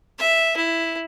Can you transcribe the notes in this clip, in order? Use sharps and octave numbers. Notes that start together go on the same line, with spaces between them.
E5
E4